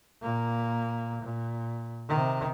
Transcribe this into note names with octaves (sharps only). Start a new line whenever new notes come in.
A#2 A#3
A#2
C3 D#3